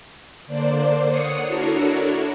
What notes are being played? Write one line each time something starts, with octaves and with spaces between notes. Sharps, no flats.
D3 A#3 D4 C5 D5
C#5 F#5 D#6 C7 C#7
D4 E4 F#4 A4 A#4 C#5